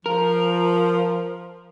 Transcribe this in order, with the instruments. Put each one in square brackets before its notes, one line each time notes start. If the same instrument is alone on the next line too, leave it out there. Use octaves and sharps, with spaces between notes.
[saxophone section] F3 [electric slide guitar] A#4